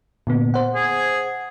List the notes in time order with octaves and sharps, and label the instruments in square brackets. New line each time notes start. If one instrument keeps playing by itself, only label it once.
[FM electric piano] A#2 D3 B3
C5 F#5
[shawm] G#4